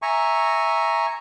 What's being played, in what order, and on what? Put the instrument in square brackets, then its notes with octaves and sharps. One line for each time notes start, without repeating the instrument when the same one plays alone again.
[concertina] E5 G#5 A#5 C#6